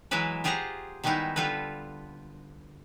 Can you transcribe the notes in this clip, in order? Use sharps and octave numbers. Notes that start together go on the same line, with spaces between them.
E3 F#3 G#3 B3 E4 B4
F4 G4 G#4 C5 F#5 A#5
D#3 G3 G#3 B3 D#4 E4
D3 G3 F4 A4 B4